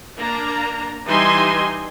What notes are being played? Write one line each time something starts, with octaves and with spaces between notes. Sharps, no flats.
A#3 D4 A#5
E3 G3 D#4 D#5 G#5 C6